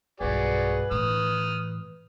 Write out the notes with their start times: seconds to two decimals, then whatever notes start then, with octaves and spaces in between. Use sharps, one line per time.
0.20 B1 G2 F#4 G#4 B4 D5
0.91 A2 E3 D#6 F6